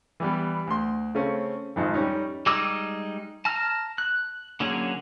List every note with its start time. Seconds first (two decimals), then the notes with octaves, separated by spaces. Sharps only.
0.20 E3 G3 B3
0.67 D2 C6
1.15 C#3 A3 C4 C#4
1.76 G#1 F2 D#3
1.94 G3 C#4 D#4
2.46 G3 G#3 D#4 D6 E6
3.45 A5 A#5 F6
3.98 F#6
4.60 D3 F#3 A#3 C#4 G#4